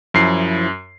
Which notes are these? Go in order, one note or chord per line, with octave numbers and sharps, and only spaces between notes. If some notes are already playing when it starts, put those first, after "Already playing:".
F#2 F3 E4 C7